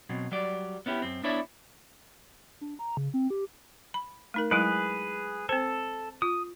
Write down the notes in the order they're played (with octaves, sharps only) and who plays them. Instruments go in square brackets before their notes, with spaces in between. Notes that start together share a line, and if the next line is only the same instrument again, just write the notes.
[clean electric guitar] B2 F#3 C4
F#3 G3 D5
B3 C#4 E4 G4
F#2 C4
B3 D4 E4 C#5 D5 E5
[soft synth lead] D4
A#5
C#3
C4
G4
[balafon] B5
A3 D#4 A#4
[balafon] F#3 G#3 E4 [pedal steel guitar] G#4 B4
[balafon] C4 C5 [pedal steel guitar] A4
[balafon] F4 [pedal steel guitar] D#6